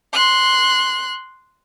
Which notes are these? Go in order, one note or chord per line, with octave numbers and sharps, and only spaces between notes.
C6 F#6